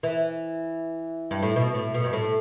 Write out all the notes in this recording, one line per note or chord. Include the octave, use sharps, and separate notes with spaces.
E3
G2
A2
B2
A2
B2
G2
A2